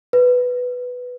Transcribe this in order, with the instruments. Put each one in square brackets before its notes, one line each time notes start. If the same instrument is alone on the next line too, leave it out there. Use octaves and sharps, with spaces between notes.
[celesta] B4